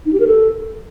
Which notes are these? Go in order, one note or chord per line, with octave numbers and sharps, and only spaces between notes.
D#4
G4
A#4
A4